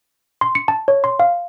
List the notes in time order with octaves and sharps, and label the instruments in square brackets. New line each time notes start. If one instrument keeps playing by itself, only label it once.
[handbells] C6
C#7
A5
C#5
C6
F5